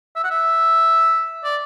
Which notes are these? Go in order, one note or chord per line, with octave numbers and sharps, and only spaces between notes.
E5
F#5
E5
D5